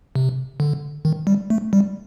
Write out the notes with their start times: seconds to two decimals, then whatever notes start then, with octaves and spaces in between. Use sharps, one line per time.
0.16 C3
0.60 D3
1.05 D#3
1.27 G3
1.50 A3
1.73 G3